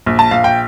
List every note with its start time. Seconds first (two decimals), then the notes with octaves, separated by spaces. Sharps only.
0.06 A#1
0.19 A5
0.31 A#1 F5
0.44 G5